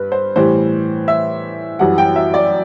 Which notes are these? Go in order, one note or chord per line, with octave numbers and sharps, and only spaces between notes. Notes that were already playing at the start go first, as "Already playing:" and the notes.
Already playing: G2 B4
C5
A2 E3 G3 C5
E5
F#2 E3 G3 F#5
G5
E5
D5